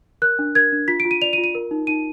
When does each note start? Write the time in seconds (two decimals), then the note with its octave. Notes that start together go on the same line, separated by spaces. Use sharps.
0.22 A#4 F#6
0.39 D4
0.55 A#4 G#6
0.72 D4
0.88 F4 B6
1.00 D7
1.05 F4
1.11 D#7
1.22 D5 F7
1.33 D#7
1.38 F4
1.44 D#7
1.55 A#4
1.71 D#4
1.87 D#4 D#7